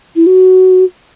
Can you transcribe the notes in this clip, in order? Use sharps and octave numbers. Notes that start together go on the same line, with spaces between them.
E4
F#4